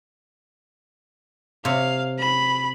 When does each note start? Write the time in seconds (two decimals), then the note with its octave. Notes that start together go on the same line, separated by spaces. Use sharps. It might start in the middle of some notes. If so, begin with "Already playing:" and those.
1.65 C3 C#5 F5
2.19 B5